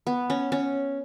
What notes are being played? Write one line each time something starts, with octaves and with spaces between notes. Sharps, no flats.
B3
C#4
C#4